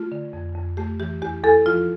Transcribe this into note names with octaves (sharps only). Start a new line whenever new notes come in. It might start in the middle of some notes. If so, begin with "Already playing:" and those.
Already playing: A3 F4
D3
F2
F2
A3 G4
E3 G4
E2 G4
E2 A4
F3 F4